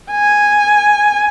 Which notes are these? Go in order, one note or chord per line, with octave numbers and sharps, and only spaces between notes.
G#5